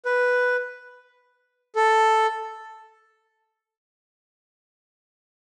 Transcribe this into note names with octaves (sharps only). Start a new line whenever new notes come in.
B4
A4